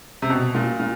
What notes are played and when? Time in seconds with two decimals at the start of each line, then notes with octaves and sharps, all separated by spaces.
0.22 C3
0.30 B2
0.55 A#2
0.80 A#2